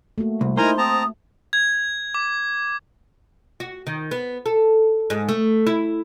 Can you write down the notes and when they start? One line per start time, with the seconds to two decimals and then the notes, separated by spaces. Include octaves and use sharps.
0.18 A3 A#3 F#4
0.41 C2
0.57 D#4 E4 A#4 C5 G#5 A#5
0.78 C4 A5 A#5 D#6
1.53 G#6
2.14 D6
3.60 F#4
3.87 D#3
4.11 B3
4.46 A4
5.10 G#2
5.29 A3
5.67 E4